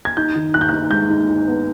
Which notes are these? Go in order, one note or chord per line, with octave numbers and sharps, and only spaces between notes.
G#6
D#4 G6
D#3
D#4 F#6
G6
D#4 F#6
G#3 G6
D#4
D#4
B3